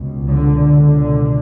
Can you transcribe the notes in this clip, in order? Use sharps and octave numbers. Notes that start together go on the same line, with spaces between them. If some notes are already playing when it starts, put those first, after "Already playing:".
Already playing: C#2 B2
D3
C#2 B2 D3